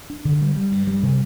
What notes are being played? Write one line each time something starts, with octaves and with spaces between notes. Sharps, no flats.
D4
D3
G3
G3
G2
G3
C3